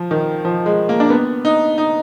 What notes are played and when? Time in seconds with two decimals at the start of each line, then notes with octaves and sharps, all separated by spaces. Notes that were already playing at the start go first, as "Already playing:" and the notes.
Already playing: F3
0.11 D#3
0.45 F3
0.66 G#3
0.89 A#3
1.00 D4
1.10 B3
1.45 D#4
1.78 D#4